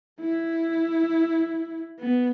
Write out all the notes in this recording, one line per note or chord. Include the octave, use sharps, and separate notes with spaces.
E4
B3